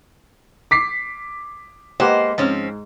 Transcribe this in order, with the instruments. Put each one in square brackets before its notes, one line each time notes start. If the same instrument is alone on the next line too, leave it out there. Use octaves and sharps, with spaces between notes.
[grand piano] D6 B6 C7
[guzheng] G#3 [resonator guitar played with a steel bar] A#3 C5 [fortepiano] G4 B4 F#5
[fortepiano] G#2 [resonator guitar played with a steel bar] F3 C4 C#4